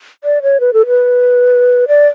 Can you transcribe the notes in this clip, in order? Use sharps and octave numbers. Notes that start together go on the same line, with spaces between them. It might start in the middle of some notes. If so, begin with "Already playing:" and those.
D5
C#5
B4
A4
B4
D5